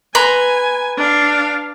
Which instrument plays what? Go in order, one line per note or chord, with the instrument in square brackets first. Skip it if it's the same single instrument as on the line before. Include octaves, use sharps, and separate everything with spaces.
[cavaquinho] B4 A#5 C6 [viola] G#5
[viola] D4 F5